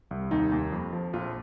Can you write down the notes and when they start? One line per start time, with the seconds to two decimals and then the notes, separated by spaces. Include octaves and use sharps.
0.11 C2
0.31 D#2 D#4
0.52 D#2
0.72 F2
0.93 F3
1.13 A#1 F4